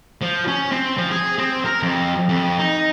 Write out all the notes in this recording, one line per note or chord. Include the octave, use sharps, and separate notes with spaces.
F3
C#4
C4
F3
G#4
C4
A#4
F2
F2
D#4